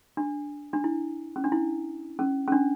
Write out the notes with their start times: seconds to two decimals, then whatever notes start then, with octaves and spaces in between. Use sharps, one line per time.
0.17 D4
0.73 D4
0.84 E4
1.36 C#4
1.44 D4
1.52 E4
2.19 C#4
2.48 C#4
2.52 D4